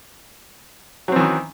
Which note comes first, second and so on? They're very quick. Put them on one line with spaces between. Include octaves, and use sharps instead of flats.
F#3 C4 E3 D#3